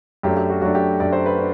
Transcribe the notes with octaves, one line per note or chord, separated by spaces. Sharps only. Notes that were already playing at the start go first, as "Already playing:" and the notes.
F#2 F#3 A3 D4 G4
G4
F#4
F#2 F#3 A3 D4 F#4
G4
F#2 F#3 A3 D4 D5
C5
B4
D4